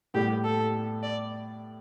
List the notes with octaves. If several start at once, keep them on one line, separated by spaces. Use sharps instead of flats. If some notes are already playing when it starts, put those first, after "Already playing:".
A2 G3 B3 G4
A4
D5